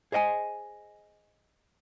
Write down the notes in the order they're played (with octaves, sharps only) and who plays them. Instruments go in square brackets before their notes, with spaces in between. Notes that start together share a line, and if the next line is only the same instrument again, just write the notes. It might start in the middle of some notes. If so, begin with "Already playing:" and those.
[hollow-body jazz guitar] G#4 C5 D#5 F#5 G#5